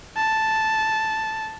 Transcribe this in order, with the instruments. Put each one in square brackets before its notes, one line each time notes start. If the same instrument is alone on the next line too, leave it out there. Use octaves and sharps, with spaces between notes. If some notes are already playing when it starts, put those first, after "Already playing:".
[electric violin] A5